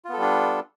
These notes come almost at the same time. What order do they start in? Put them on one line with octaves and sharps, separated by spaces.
F4 B3 A4 G3 D4